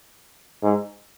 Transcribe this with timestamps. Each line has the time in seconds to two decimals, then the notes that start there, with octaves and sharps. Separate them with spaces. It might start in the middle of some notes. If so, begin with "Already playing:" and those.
0.63 G#2